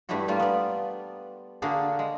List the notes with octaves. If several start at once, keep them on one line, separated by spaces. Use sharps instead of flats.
G2 G3 A3 D4 E4 F#4
G3 A3 A#3 F4
B3 D5
D3 A#3 D4 F#4 G#4
G#3